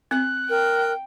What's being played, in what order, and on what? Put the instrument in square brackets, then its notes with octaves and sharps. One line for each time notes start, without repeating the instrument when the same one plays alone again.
[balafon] C4 [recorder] F#6
[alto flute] A#4 [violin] G5